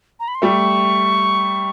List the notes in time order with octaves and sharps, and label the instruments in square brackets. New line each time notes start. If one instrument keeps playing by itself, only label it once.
[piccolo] A#5
B5
C6
[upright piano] G3 A3 [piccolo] C#6